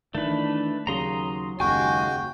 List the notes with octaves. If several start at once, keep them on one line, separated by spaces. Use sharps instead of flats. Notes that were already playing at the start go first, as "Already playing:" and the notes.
D#3 E3 A3 D4 B4
D#2 C#3 F#3 A#5 C6 D#6
F#1 D#2 C#3 G#3 F#4 G5 G#5